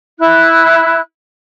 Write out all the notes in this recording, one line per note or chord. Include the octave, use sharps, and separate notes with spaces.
E4 F#6